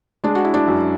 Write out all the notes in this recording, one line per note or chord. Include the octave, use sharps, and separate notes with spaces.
G#3 D4
F#4
E4
D4
F#2